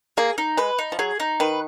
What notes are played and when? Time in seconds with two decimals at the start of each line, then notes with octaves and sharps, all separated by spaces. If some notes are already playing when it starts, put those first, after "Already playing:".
0.17 A#3 G#4
0.38 D#4
0.57 G#3 B4
0.79 D#4
0.92 F3
0.99 F#3 G#4
1.20 D#4
1.40 D#3 B4